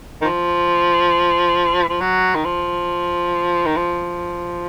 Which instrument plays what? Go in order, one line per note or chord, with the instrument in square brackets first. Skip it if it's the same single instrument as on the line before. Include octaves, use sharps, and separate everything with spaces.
[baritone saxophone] D#3
F3
F3
F#3
D#3
F3
D#3
F3